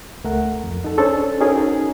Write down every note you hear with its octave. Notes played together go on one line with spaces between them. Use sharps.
C#2 A3 A#4 F#5
F2
D#4 A4
C#4 D4 G#4 A4 C5 C#5
C#4 D#4 F#4 G#4 A#4